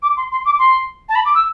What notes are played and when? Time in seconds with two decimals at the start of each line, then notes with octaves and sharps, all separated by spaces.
0.02 D6
0.17 C6
0.31 C6
0.45 D6
0.59 C6
1.09 A5
1.15 B5
1.25 D6
1.35 E6